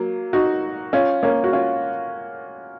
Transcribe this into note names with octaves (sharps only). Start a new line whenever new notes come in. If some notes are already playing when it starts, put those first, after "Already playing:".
Already playing: F#3 A#3
D#4 F#4
C#4 F4
A#3 C#4
F#4
C#4 F4